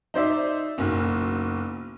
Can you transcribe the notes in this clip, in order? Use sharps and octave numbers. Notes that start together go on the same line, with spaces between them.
D#4 C5 D5 E5
F#1 B1